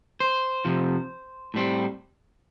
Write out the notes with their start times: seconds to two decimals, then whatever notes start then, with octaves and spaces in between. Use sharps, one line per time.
0.20 C5
0.65 F2 C3 F3
1.54 A2 G3 C4